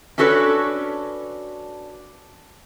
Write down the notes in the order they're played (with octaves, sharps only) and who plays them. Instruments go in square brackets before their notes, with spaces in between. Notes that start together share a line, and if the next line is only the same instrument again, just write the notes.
[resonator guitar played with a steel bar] C#4 D4 F#4 A4 B4 C#5